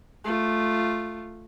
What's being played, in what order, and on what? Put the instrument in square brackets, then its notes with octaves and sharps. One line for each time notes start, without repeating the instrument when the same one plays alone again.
[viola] A3 F4